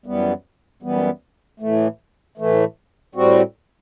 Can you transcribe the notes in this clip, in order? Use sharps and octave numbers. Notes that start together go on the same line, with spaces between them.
F#2 E3 G3 B3
F#2 E3 G3 B3
A2 E3 A3
A2 E3 A3
A2 G3 C4 F#4